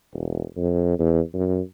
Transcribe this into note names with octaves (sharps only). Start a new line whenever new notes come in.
E1
F2
E2
F#2